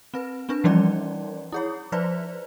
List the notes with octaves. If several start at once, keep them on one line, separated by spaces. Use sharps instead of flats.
C4 B4
C4 D4 B4
E3 F3 G3 C#4 D#4 D5
E4 G#4 C#5
F3 B4 C5 D5